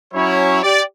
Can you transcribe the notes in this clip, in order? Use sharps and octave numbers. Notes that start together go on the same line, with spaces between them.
F#3 C#4 E4 C#5
G4 D5